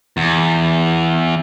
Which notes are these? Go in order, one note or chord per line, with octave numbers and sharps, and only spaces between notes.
E2